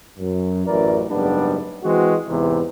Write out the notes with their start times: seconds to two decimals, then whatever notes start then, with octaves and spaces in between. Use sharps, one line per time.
0.19 F#2
0.67 A1 F#2 E3 A#4 D5
1.10 F#1 G#2 G3 B3 D4
1.84 E3 G#3 C4 F#4
2.27 E2 G#2 C3 E3